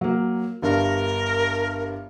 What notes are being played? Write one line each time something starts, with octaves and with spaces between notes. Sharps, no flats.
F#3 A#3
G1 G2 D4 A#4